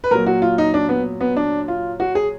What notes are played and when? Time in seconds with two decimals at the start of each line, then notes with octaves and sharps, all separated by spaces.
0.04 B4
0.11 A#2 F#3 A#4
0.26 F#4
0.42 F4
0.58 D#4
0.74 D4
0.89 B3
1.21 B3
1.37 D4
1.68 F4
2.00 F#4
2.15 G#4